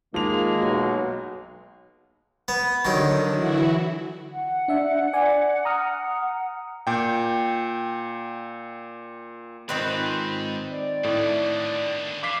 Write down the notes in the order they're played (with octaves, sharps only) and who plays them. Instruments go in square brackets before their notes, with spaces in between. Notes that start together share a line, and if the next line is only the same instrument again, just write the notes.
[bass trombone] D#3 [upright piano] F3 F7 [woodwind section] G#3 A#3
[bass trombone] B1 [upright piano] F#3
[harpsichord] B3
[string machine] D3 [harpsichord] D#3 F#3
[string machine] E3 E4 F#4
[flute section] F#5
[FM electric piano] D4 E5
D5 G#5
A#5 D#6 F6
[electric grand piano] A#2 G5
[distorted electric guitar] G#2 [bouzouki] D#3 C4 B4 [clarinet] F4
[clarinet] D5
[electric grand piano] A2 [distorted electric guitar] D3 G3
[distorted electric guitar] E3 [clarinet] F5 [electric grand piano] D6 B6 C7